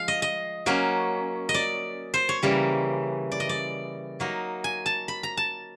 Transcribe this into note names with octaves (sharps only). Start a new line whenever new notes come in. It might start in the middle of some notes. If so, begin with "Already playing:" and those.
Already playing: F3 G#3 F5
D#5
D#5
F#3 A#3 C#4
D#5
D5
C5
C#5
C#3 E3 G3 A#3
D5
D#5
D5
F#3 A#3 D#4
G#5
A5
B5
A#5
A5